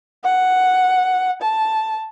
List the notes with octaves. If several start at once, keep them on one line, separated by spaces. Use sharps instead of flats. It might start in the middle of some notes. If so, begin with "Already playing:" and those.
F#5
A5